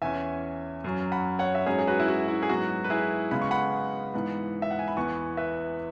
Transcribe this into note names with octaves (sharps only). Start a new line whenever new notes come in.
E2 E3 C#4 E5 G#5
F#2 F#3 C#4
F#5 B5
C#5 F#5
E5
G#2 F#3 C#4 G#4 C#5
G#4
F#4 B4
E4
F#4
E4
G#4
G#2 F#3 B3 F#4
B4
E4 G#4
C#3 G#3 B3 B5
C#6
F#5 B5
G#2 E3 B3
E5
F#5
G#5
B5
E2 E3 B3 G#5 C#6
B4 E5